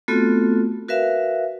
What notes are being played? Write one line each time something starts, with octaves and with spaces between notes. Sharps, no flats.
A3 B3 C4 F4 F#4 A4
F#4 A#4 B4 E5 F5